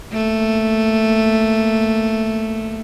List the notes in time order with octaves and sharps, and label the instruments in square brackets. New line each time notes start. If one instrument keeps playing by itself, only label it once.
[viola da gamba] A3 A#3